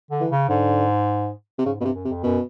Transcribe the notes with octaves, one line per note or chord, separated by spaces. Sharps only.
D3
E3
C#3
G#2 D3
C3
G#2 C#3
G2 B2 C3
F#2
C3
F2
F#2 B2